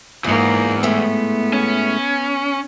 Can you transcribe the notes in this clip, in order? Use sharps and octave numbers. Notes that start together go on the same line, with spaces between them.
E2 G#2 A#3 F4
A2 G#3 A3 B3
C#4